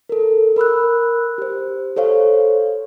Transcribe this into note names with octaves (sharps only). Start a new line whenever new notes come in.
A4 A#4
A#4 B5 E6 F#6
G4 C5
A4 C5 C#5 F5